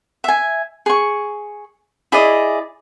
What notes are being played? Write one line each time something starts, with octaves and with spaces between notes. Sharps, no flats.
E5 G#5
G#4 C#6
E4 G#4 D5 D#5